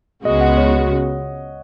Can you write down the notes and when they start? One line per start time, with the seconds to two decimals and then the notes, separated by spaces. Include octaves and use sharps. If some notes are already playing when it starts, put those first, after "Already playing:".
0.25 C#2 C#3 G#3 B3 F#4 D#5
0.41 F#5
0.57 C#5